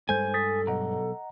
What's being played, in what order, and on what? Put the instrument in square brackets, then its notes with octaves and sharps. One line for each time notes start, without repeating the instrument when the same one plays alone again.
[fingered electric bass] G2 G3 G#3 [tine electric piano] A4 C5 G6 [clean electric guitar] G#5
[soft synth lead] A4 [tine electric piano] D#6 A6 B6
[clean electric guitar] B1 [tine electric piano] D#5 F#5 A#5